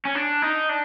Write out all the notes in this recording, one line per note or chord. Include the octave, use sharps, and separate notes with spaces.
C#4
D4
D#4
D4